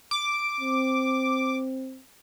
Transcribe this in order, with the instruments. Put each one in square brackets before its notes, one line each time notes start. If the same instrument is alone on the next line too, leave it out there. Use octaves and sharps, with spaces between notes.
[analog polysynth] D6
[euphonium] C4